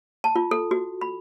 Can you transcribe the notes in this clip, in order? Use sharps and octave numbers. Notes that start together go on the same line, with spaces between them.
A5
F4
A4
F#4
B5